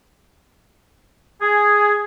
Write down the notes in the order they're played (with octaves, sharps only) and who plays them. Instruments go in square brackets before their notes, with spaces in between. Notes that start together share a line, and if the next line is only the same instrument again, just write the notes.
[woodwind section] G#4